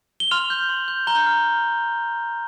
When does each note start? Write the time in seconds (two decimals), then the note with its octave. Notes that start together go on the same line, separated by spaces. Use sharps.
0.20 G7
0.31 C6 F6 F7
0.50 G6
0.69 C6
0.88 G6
1.07 A#5 G6 G7
1.26 F6